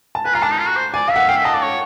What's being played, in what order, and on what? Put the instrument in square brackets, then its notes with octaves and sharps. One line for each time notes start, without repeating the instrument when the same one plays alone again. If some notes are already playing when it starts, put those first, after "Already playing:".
[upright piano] A5
[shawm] B4 [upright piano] G#5
[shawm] F4 [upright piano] A#5
[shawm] D4 [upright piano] A5
[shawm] D#4
F4
F#4
C5
[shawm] D5 [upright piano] G#5
[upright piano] F5
[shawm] E5 [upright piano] F#5
[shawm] F5 [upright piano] G5
[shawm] E5
[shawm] D#5 [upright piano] A5
[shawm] D5
C#5